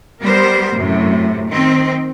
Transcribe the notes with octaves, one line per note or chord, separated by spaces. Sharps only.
G3 B3 A#4 C5
F#2 A2 C3
D#3 C4